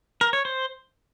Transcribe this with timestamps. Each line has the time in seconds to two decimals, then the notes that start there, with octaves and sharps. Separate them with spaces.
0.21 A#4
0.33 C#5
0.45 C5